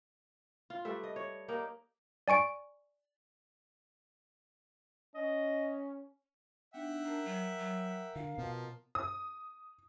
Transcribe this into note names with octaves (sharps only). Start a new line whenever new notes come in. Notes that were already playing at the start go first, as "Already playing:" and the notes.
F4
G3 A3 B4 E5
D#5
C#5
A#3 D#4 G4 A#4
D5 G#5 C#6 D7
C#4 D#5
B3 D4 D#4 E5 F#5 G5
D4 A#4 A#5
F#3
F#3
D3 F5
B2 F3
D#6